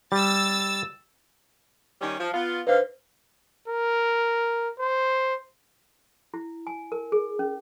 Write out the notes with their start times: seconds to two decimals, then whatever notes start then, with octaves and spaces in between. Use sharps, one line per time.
0.12 G3 E6 A6
2.01 D#3 G3 C#4
2.19 F3
2.33 B3 F4
2.67 D3 D#4 B4 C5 F5
3.68 A#4
4.79 C5
6.34 E4
6.67 G#5
6.92 A#4
7.12 G#4
7.39 C#4